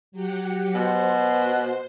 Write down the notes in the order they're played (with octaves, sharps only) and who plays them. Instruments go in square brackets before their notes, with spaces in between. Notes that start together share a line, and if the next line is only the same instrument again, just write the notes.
[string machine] F#3 G4 F#5
[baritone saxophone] B2 [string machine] C5